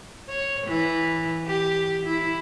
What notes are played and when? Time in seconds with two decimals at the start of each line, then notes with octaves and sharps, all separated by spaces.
0.29 C#5
0.67 E3
1.47 G4
2.06 E4